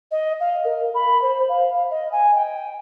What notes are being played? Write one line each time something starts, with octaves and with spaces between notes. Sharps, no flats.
D#5
F5
A#4
B5
C5
F5
F5
D#5
G#5
G5